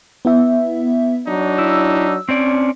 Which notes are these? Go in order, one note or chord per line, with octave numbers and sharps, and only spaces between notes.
B3 E4 E5
F#3 D4 D#4
E4 E6
C4 C#4 D5